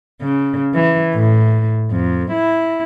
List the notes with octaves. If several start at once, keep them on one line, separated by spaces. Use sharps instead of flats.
C#3
E3
A2
F2
E4